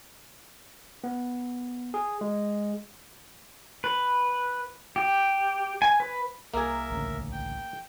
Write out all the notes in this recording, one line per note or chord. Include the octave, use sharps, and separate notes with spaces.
B3
G#4
G#3
B4
G4
G#5
B4
C2 A#3 G#4 A#4 E5
A1 D2 C#3
G5